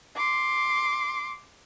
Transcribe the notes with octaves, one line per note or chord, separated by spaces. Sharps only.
C6 D6